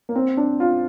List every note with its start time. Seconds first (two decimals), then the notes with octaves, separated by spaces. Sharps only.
0.09 A#3
0.15 C4
0.37 D4
0.60 F4